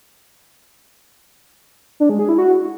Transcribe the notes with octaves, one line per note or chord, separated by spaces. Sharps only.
D4
G#3
G#4
E4
F#4